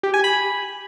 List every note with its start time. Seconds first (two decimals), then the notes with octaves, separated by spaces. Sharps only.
0.03 G4
0.14 G#5
0.24 B5